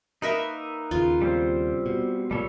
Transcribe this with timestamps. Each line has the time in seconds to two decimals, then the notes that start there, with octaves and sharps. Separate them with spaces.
0.22 A#3 D#4 A#4 B4 D#5 E5
0.91 D#2 C#3 F4
1.22 G3 C4 C5
1.86 B2
2.31 B1 A#2 G3 A4 C#5